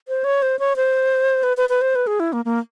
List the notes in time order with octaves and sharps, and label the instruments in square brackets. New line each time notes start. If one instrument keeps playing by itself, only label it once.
[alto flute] C5
C#5
C5
C#5
C5
B4
B4
B4
C5
B4
G#4
E4
A#3
A#3